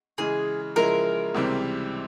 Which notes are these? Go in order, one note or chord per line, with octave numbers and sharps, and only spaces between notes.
C#3 E3 G#3 G#4
C#3 F3 G#3 E4 A#4
C#2 C3 E3 G3 C4